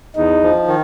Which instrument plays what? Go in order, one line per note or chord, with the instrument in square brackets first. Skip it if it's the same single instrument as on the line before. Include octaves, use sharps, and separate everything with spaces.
[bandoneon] E2 [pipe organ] D#4
[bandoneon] F3
D#3